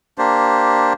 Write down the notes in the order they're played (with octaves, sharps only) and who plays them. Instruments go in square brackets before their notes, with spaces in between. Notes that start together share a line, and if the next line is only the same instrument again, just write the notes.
[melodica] A#3 D4 G4 C5